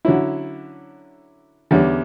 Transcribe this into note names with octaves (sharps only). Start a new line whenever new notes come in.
D3 F#3 C#4 E4
E2 D3 G3 C#4